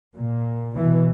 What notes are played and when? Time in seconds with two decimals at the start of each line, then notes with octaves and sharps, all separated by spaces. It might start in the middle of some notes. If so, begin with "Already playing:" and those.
0.16 A#2
0.77 B2 E3